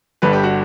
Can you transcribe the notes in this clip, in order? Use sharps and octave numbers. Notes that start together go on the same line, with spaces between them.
G1 G2 D3 G3 B4
G4
F#4